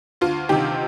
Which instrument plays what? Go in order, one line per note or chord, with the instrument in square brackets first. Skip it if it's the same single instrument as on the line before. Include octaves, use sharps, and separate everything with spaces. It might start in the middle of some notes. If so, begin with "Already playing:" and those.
[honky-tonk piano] D2 F4
C3 D#3 G4